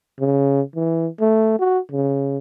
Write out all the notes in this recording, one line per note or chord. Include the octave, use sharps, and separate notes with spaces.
C#3
E3
A3
F#4
C#3